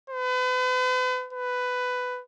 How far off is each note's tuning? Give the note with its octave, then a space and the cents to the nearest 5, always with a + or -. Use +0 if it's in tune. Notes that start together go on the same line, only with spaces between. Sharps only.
B4 +40
B4 +10